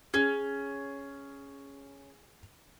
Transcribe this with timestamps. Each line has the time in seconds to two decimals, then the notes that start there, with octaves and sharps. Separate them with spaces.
0.14 C#4 G#4